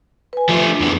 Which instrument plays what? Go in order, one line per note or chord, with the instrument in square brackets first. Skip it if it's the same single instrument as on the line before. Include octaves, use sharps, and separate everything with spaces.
[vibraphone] B4 G#5
[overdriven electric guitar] F3 A3
[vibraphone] D4
[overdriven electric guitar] F2 B3